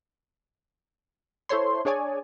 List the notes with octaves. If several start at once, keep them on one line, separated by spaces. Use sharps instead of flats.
E4 A4 C5 C#5 C6
D4 G#4 C#5 D5 G#5